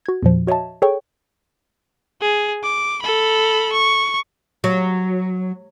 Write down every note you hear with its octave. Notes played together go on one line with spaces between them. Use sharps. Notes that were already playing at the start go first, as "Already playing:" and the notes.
F#4 G#6
E2 A#2 F3
F#4 C#5 D#5 E5 A5
G#4 A4 C#5 G5 C#6
G#4
D6
A4 B5
C#6
F#3